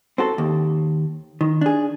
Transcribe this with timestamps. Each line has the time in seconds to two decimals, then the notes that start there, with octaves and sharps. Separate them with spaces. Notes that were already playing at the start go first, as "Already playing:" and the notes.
0.18 C4 F#4 A4
0.38 D#2
1.41 D#3
1.61 D4 G#4